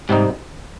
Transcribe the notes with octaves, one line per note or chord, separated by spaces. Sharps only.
G#2 C3 G3 C4 D#4